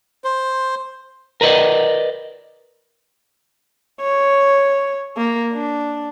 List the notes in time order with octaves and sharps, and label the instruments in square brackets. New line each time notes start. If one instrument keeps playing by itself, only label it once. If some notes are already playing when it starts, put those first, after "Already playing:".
[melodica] C5
[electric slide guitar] A#4 B4 D5 D#5
[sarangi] C#5
A#3
D4